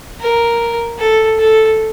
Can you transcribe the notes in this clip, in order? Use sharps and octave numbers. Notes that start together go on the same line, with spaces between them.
A#4
A4
A4